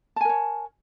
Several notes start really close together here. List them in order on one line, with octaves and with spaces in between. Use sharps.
A5 G#5 A#4 C#5